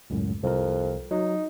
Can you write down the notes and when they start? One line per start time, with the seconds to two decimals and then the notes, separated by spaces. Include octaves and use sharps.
0.10 C#2 F#2 A2
0.43 C2 F2 A#4
1.11 F#3 D#4